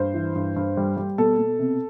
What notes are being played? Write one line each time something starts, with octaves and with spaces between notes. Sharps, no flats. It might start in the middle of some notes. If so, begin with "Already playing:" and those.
Already playing: G2 C5
E3
G2
G2
G3
G3
B2 A4
B2
C3